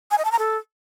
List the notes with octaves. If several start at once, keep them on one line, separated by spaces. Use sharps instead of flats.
G#5
D#5
A5
A#5
A4